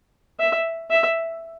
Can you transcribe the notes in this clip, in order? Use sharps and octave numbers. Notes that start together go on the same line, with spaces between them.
E5
E5